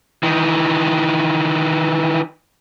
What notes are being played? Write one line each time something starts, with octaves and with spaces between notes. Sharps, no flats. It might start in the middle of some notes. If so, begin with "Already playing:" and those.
D#3 E3